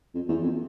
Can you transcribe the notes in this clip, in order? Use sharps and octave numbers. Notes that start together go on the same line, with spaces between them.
F2
E2
F2